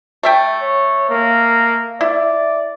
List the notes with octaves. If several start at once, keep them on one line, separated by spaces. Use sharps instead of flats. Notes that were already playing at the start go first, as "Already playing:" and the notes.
A3 E5 G5
C#5
A#3
E4 D5